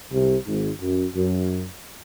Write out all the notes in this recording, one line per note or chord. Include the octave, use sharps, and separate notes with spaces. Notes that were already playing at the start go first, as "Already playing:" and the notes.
C2 C3
G#1 G#2
F#2
F#2